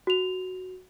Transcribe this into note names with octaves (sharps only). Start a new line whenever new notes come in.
F#4 F7